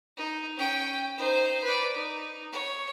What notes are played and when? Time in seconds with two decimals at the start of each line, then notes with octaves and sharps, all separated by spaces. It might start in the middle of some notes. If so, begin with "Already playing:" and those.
0.17 D#4
0.57 C#4 G5
1.17 D#4 C5
1.64 B4 D5
1.95 D#4
2.52 C#5